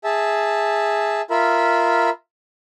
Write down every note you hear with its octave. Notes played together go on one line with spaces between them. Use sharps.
G#4 E5 A5
F4 A#4 E5 B5